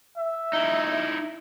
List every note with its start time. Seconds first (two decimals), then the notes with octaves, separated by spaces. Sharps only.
0.17 E5
0.53 D#4 E4